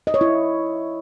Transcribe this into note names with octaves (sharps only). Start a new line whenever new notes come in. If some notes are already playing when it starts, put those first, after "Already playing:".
D#5
C#5
E4